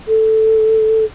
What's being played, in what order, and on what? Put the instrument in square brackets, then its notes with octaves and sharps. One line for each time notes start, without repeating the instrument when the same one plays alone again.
[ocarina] A4